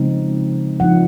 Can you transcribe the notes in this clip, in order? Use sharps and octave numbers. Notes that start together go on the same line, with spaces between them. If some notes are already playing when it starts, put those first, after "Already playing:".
Already playing: C#3 F3 G#3 C4 D#4
F3 C4 D#4 F#5